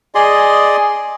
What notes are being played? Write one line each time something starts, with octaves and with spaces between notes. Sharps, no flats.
G#4 D5 D#5 C6